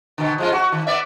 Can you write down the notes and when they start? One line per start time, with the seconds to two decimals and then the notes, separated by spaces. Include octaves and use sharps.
0.18 B2 D3
0.38 F3 G#3 F4
0.52 F#4
0.72 D#3
0.87 B3 D5 E5